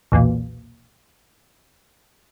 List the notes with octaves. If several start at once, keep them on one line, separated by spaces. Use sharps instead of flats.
B1 E2 A#2